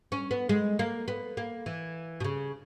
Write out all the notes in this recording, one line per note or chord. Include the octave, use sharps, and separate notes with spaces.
C#4
B3
G#3
A#3
B3
A#3
E3
B2
C#3